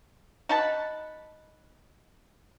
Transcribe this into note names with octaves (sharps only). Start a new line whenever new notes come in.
D#4 F#4 B4 A5